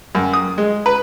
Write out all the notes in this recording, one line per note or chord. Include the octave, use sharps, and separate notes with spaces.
F#2
D#6
G#3
B4